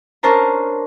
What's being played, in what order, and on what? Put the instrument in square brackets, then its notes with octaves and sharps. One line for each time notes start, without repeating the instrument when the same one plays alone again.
[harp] C#4 D4 A#4 C5 A5 A#5